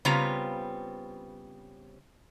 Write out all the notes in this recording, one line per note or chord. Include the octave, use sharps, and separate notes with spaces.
C#3 G3 B3 C4 F4 A#5